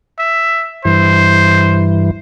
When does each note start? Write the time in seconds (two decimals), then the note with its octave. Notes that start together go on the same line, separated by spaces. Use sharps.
0.19 E5
0.85 G2 E3 C5